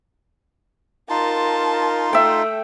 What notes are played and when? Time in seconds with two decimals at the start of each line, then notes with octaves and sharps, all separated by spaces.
1.10 D#4 F4 A#4 A5 C6
2.13 A3 E5 G5